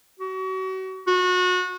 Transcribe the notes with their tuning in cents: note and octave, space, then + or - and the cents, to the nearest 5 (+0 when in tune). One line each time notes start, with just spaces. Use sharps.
F#4 +35
F#4 -25